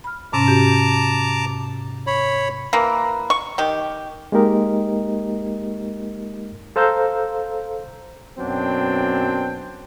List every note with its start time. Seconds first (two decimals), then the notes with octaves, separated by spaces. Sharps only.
0.04 B5 F6
0.33 G#2 C3 C#4 A5 A#5 D6
0.48 F#4 G4
2.07 C#5 B5
2.73 E3 A#3
3.30 C#6
3.58 D#3 G4
4.32 G#3 A#3 D#4 G4 A#4 D#5
6.76 A4 C5 F5 A#5 E6 G6
8.38 F#2 B2 F#3 C4 D4 G5